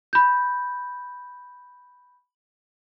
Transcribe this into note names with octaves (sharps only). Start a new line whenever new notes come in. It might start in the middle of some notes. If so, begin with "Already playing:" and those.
B5 G6